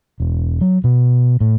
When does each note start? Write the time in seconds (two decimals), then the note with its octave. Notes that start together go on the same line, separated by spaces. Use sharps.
0.20 E1
0.61 F#3
0.84 B2
1.41 A2